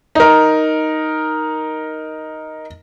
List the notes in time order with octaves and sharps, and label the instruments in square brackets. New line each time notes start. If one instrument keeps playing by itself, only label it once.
[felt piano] D#4 A#4